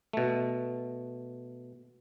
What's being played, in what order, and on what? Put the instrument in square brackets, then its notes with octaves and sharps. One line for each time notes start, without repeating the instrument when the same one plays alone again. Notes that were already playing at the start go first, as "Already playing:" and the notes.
[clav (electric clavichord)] B2 A3